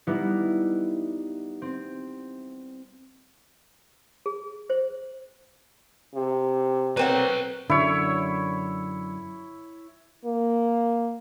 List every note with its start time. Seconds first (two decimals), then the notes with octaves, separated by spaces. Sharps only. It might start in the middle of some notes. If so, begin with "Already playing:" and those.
0.07 G3 B3 D#4 E4
1.62 C4
4.26 G#4
4.70 C5
6.15 C3
6.97 A#3 C4 B4 C#5 F#5
7.70 F#2 D3 E4 C#5
10.25 A#3